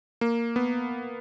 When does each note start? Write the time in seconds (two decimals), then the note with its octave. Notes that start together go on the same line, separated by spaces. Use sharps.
0.21 A#3
0.56 B3